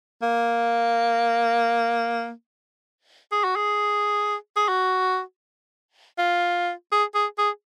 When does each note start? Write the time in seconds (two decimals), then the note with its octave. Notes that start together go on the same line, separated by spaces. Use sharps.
0.22 A#3
3.32 G#4
3.44 F#4
3.56 G#4
4.56 G#4
4.69 F#4
6.18 F4
6.92 G#4
7.15 G#4
7.38 G#4